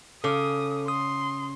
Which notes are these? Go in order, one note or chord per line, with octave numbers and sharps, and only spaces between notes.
C#3 A4 D6 D#6
C6 D#6